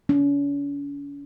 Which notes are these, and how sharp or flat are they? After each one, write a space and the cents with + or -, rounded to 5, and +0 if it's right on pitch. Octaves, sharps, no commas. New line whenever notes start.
C#4 +40